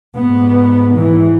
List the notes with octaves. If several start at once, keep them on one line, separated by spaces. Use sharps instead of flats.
G#2 B3
E3